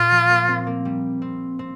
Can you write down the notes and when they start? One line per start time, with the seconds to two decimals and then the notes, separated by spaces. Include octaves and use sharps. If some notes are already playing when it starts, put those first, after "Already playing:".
Already playing: A#2 F4
0.11 F3
0.30 A#3
0.48 C4
0.67 A#3
0.85 G3
1.22 C4
1.59 C4